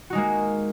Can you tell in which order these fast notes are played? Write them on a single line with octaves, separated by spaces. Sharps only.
F#4 D#4 G#3 A#3